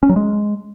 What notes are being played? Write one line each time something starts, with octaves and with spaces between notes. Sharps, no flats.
C#4
F#3
G#3